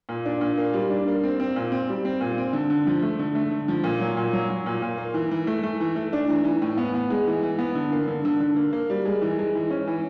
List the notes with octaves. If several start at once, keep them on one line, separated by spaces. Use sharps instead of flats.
A#2
D4
A#2
A#3
G3
D4
A#3
C4
C4
A#2
C4
G3
C4
A#2
C4
D3
D3
F3
A3
D3
A3
D3
F3
A#2
F#3
A#2
F#3
F#3
A#2
A#2
A#3
E3
E3
A3
A3
E3
A3
D4
E3
E3
A2
B3
B3
G#3
E3
E3
B3
D3
A#3
D3
D3
D3
A#3
A#3
G3
G#3
E3
G#3
E3
C#4
E3